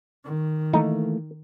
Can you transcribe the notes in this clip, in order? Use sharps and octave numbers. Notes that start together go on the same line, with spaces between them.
D#3
E3 A3 A#3 D#4